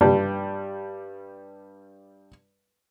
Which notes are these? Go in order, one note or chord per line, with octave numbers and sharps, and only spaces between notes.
G2 G3 A5